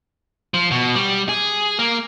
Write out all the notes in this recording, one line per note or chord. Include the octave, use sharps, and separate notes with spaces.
F3
B2
G3
G#4
A#3